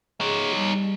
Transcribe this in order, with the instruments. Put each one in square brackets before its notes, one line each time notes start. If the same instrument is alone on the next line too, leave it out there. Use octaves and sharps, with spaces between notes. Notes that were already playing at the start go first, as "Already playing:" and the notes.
[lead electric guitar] D#4 C#5 [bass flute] G#4
[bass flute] G3